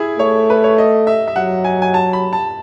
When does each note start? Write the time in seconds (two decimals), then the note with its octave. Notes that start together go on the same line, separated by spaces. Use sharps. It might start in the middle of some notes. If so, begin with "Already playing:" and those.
Already playing: E4 G#4
0.19 A3 C#5
0.50 B4
0.64 C#5
0.78 D#5
1.07 E5
1.28 E5
1.35 F#3 F#5
1.64 G#5
1.82 G#5
1.94 A5
2.13 B5
2.33 A5